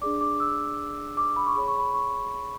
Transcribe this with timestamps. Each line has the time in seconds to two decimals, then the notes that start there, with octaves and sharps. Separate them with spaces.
0.01 D4 G#4 D5 D6
0.21 D6
0.40 E6
1.17 D6
1.36 B5
1.46 C#6
1.55 G#4 C#5 B5
1.68 C#6
1.78 B5
1.94 C#6